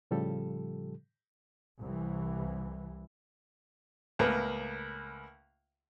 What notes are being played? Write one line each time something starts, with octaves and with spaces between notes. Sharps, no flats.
A2 C#3 F3 G3 G4 A4
C2 E3
C#2 A2 A#3 B3 B4